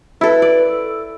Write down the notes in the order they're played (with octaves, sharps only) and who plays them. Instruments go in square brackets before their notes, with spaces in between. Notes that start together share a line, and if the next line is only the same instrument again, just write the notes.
[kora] E4 A4 [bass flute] B4
[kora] D5
[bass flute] A4